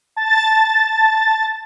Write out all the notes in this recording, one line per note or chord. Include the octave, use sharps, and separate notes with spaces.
A5 A6